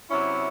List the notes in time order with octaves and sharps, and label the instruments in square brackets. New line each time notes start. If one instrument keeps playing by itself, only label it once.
[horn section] C3 F#3 C#4 E4